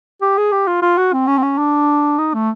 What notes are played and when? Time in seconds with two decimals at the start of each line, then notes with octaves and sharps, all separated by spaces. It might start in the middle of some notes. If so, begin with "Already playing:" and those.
0.22 G4
0.38 G#4
0.52 G4
0.67 F4
0.82 F4
0.98 F#4
1.13 C4
1.27 C#4
1.38 C4
1.43 C#4
1.58 D4
2.19 D#4
2.34 A3